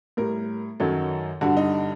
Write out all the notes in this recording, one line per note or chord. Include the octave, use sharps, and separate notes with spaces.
A2 G3 A#4
F#2 D#3 F#3 A4
G2 D3 G3 F#4
D#4